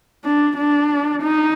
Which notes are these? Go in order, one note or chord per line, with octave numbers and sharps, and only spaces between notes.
D4
D4
D#4